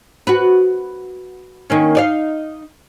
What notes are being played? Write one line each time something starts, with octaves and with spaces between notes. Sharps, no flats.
F#4 B4
D#3 A#3 C#4
D#4 D5 F5